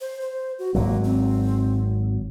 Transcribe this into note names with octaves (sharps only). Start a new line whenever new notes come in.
C5
C5
F#4
G#1 F#3 A#3
C4